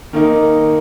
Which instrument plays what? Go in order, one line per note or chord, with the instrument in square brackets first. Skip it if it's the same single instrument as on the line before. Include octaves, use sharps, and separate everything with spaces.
[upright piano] D#3 A#3 D#4 A#4